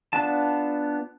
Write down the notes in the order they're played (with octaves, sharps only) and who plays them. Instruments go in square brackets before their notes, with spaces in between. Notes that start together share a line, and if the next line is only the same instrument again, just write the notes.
[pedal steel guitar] B3 D4 F4 A5